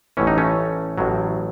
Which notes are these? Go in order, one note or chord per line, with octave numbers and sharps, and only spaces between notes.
A1 A2 E3 C#4
D#4
A3 C#4
A1 A2 F#3